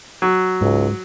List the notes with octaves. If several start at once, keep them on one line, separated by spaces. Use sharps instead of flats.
F#3
C#2 G#2